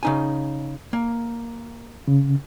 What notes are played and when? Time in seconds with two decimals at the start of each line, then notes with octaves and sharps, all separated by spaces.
0.03 C#3 D#4 G#5
0.93 A#3
2.08 C#3